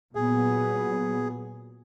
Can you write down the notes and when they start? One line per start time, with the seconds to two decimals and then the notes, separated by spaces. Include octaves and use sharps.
0.15 A#2 F#3 B3 G#4